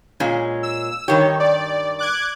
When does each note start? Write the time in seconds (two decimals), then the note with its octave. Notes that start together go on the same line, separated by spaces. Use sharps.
0.20 A#2 G#3 C#4
0.63 E6
1.08 G2 D#3 G4 C#5
1.40 D5
1.99 D6 F#6 G#6